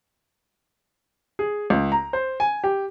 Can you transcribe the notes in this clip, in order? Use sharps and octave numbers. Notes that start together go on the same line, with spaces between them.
G#4
C#2
A#5
C5
G#5
G4